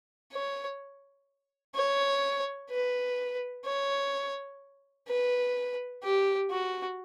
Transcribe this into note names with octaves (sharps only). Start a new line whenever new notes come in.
C#5
C#5
B4
C#5
B4
G4
F#4